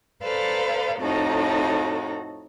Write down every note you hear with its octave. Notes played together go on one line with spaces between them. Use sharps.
A4 B4 C5 D5 F5 A#5
F2 A2 D#4 F#4 A4 A#5